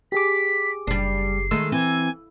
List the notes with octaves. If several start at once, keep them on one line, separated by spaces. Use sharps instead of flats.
G4 G#4 D6 B6
F#1 G3 D4 C7
D#3 G#3 A3 E6
E3 C4 G#5